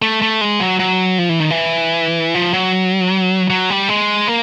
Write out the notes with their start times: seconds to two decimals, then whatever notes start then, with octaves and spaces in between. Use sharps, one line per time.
0.02 A3
0.22 A3
0.41 G#3
0.60 F#3
0.79 F#3
1.18 F3
1.29 E3
1.40 D#3
1.50 E3
2.34 F3
2.53 F#3
3.50 F#3
3.70 G3
3.89 G#3
4.28 A#3